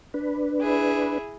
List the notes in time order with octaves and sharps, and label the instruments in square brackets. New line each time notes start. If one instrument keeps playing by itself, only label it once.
[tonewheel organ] D4 B4
[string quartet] E4 G#4